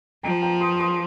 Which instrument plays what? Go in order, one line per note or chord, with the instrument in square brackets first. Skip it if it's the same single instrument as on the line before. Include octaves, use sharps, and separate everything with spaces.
[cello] F3 [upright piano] G5 A#5
[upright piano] G5 A#5
C6 D#6
C6 D#6